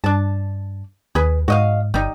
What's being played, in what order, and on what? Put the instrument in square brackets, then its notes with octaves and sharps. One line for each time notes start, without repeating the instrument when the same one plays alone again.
[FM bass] G2 [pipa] D4 A5
[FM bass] D#2 [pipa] G#4 B4
[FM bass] G#2 [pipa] F#4 D#5 F5
[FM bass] G1 [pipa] G3 D#4